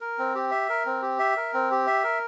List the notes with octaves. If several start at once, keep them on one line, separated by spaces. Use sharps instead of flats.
A#4
C4
G4
E5
A#4
C4
G4
E5
A#4
C4
G4
E5
A#4